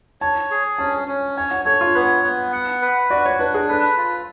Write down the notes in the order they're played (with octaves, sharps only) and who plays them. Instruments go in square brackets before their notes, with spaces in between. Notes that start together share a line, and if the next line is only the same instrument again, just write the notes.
[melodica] C#5 [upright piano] A5
[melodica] G#4
[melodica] C#4 [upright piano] A5
[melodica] C#4
[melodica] C#5 [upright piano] G#5
[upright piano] F#5
[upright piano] A4 [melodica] C#5
[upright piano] F4
[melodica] B3 [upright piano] B4
[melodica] B3
F#5
B4
[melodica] F#4 [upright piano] D5
[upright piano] C#5
[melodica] D4 [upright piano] B4
[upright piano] G#4
[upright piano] A4 [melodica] B4
[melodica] F4